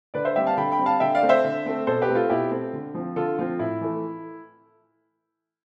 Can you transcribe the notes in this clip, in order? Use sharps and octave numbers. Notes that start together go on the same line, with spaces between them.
D3 B4 D5
C5 E5
G3 C4 E5 G5
F5 A5
D3 G5 B5
G5 B5
G3 C4
F5 A5
D3 E5 G5
D5 F5
A3 C4
C5 E5
D3
A3 C4
B2 A4 C5
G4 B4
A3 C4
F4 A4
B2 E4 G4
A3 C4
D3
F3 C4
D3 F4 A4
F3 C4 F4
A2 E4
E3 A3